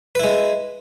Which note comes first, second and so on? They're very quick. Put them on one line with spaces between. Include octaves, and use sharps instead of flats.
B4 E4 G#3